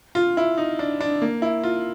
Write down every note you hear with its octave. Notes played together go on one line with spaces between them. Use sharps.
F4
E4
D#4
D4
D4
A#3
E4
F4